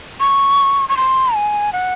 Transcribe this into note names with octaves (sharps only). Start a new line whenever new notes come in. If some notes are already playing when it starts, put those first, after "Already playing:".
C#6
C#6
C6
G#5
F#5